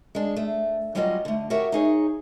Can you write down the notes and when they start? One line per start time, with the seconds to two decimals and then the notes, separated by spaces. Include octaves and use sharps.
0.15 G#3 D4
0.36 A3
0.95 F#3 G3 C#4 F4 F#4 D#5
1.25 D3 A3
1.50 F#4 G4 A#4 C#5 E5 F#5
1.72 D#4 G#4 C#5